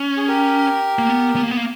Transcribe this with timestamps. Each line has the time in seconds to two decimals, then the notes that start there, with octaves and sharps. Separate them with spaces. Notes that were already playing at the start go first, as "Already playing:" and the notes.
Already playing: C#4
0.17 G#4
0.28 G4 A#4
0.99 A#3
1.09 B3
1.36 B3
1.43 A#3
1.51 B3
1.57 A#3